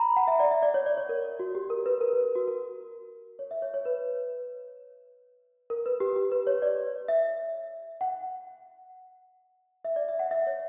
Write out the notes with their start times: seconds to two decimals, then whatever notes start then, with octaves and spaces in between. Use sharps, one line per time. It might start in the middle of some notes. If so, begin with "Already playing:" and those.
Already playing: A#5 B5
0.16 F#5
0.27 E5
0.40 D5
0.51 E5
0.63 D5
0.74 C#5
0.86 D5
0.97 C#5
1.09 A#4
1.39 F#4
1.55 G4
1.70 A#4
1.86 B4
2.01 A#4
2.13 B4
2.24 A#4
2.35 F#4
2.48 A#4
3.39 C#5
3.51 E5
3.62 C#5
3.74 C#5
3.85 B4
5.70 A#4
5.86 B4
6.00 G4
6.16 G4
6.32 B4
6.47 C#5
6.62 D5
7.08 E5
8.01 F#5
9.85 E5
9.96 D5
10.09 E5
10.19 F#5
10.31 E5
10.47 C#5